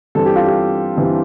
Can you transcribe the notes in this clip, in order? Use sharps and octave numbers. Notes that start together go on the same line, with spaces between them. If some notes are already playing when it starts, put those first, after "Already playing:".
G2 E3 G3 C4 A4
G4
F4
G4
G2 E3 G3 C4